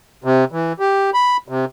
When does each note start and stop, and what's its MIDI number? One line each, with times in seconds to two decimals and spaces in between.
0.24 0.45 48
0.52 0.73 52
0.79 1.10 67
1.14 1.37 83
1.48 1.65 48